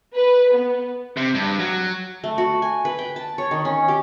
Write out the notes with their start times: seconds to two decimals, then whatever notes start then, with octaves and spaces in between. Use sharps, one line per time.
0.15 B4
0.52 B3
1.17 C3
1.35 G2
1.59 F#3
2.24 A3
2.38 F#4
2.62 G#5
2.85 B4
2.99 G5
3.16 A5
3.38 C#5
3.51 D#3
3.65 C#4
3.88 G4